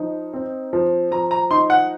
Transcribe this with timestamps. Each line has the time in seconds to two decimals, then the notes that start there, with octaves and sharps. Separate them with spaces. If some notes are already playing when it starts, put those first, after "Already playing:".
Already playing: F3 D#4
0.34 C4
0.73 F3
1.11 F3 A#5
1.31 A#5
1.51 D#4 C6
1.70 F#5